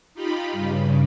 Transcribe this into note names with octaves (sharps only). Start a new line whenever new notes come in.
D#4 F4 G4 B5
G2 C#3